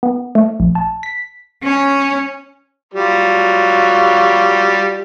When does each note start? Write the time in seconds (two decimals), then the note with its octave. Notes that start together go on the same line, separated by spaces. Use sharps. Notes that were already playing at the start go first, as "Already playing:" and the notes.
0.03 B3
0.35 A3
0.60 A#1
0.75 A5
1.03 B6
1.63 C#4
2.94 F#3 G3 F4